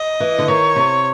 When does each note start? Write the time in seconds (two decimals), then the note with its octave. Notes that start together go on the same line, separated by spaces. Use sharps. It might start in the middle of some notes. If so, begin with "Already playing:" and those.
Already playing: D#5
0.20 E3
0.39 D3
0.48 D#3 C#5
0.76 C3